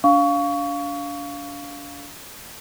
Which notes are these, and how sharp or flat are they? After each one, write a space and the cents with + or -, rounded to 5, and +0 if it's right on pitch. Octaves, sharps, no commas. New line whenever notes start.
D4 -35 F5 +0 C#6 +25